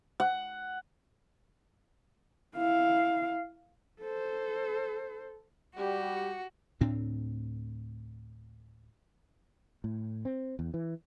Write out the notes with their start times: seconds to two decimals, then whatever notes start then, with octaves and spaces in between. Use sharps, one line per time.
0.20 F#5
2.56 E4 F5
4.01 A4 C5
5.77 G3 F#4 G4
6.81 D2 A2 C4 D4
9.84 A2
10.25 C4
10.59 E2
10.74 E3